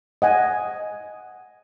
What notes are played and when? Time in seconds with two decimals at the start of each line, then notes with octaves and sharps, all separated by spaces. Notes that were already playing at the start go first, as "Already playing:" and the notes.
0.22 D#5 F#5 G#5